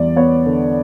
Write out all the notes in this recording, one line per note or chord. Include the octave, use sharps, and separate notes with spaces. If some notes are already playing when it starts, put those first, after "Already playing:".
Already playing: E2 G3 D5
B3 C#5
D3